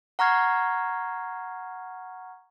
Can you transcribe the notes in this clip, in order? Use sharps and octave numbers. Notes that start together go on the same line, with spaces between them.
F#5 A#5 C#6 F6 G#6 C7